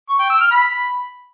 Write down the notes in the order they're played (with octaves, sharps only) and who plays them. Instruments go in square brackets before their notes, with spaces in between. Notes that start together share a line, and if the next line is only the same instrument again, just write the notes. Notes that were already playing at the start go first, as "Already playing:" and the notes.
[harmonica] C#6
G5
E6
F6
B5